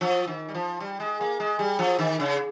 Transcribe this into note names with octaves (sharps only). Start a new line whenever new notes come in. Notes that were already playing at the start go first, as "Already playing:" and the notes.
F3
D#3
G3
F3
G3
G#3
A#3
G#3
G3
F3
D#3
C#3